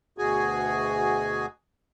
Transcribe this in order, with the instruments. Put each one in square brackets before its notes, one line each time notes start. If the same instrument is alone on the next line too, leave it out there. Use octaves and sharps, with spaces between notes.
[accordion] D2 B2 F#4 G#4 G#5